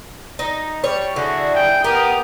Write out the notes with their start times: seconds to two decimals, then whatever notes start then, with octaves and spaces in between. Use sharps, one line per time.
0.39 D#4
0.84 G3 C#5
1.16 D3 E4 F#4 G#4
1.55 G5
1.84 B3 G4 A#4 D#6